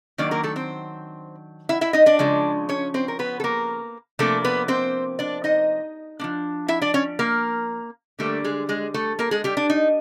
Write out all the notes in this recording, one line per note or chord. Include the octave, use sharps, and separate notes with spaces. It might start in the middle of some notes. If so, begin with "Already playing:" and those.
D#3 F#3 A#3 D4 D5
A#3 A#4
A3 A4
C4 C5
E4 E5
E4 E5
D#4 D#5
D4 D5
C#3 F3 G#3
C#4 C#5
C4 C5
A#4
B3 B4
A4
A#3 A#4
C3 F3 A3 A#3 D4 A4
B3 B4
C4 C5
D4 D5
D#4 D#5
F3 A#3 D4
E4 E5
D4 D5
C#4 C#5
A#3 A#4
D3 G3 A3 A#3 A4
G#3 G#4
G#3 G#4
A3 A4
A#3 A#4
G#3 G#4
G3 G4
D4
D#4